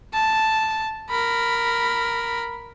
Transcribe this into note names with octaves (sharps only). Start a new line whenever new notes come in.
A5
A#4 B5